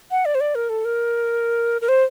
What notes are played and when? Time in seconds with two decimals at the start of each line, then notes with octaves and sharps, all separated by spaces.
0.11 F#5
0.25 D5
0.35 C5
0.40 D5
0.55 A#4
0.69 A4
0.85 A#4
1.81 A#4
1.88 C5